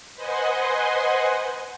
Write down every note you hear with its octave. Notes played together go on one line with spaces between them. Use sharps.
B4 C5 D#5 F#5 G#5 C6